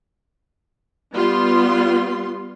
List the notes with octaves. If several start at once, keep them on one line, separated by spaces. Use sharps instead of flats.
G3 B3 F4 C6